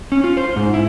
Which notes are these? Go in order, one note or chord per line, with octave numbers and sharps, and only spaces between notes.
C#4
F4
C5
G#2
E4